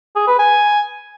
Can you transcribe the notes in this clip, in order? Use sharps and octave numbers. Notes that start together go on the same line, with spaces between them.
G#4
B4
G#5